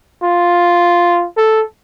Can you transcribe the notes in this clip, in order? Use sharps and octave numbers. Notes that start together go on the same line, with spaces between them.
F4
A4